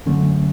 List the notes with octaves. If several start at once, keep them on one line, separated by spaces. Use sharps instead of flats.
F#2 D3 F#3 A3 C#4